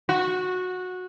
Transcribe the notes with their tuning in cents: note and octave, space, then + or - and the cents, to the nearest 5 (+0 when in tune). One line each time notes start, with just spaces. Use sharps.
F#4 -15